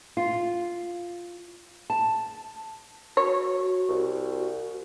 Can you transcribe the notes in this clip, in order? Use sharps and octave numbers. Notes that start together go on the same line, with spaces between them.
F4
A5
F#4 C#5
C2